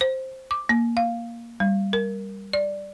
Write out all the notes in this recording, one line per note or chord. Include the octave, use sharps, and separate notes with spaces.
C5
D6
A#3
F5
G3
A#4
D5